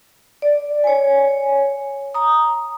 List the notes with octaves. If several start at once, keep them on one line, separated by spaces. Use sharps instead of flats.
D5
C#5 G#5
A#5 D#6